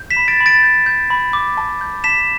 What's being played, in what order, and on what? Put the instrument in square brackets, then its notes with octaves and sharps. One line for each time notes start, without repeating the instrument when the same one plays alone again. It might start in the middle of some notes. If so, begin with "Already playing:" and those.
Already playing: [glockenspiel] G6
B6 E7
B5
A6 D7
B5
A6 D7
G6
G6
B5
D6
A5
G6
A5 B6 E7